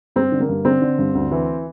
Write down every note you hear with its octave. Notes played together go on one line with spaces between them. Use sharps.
G2 C4
D3
A#3
G2
D3 C4
D3
G2
D2
E3